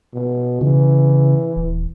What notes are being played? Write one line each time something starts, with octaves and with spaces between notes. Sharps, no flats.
B2
C#3 E3
D#1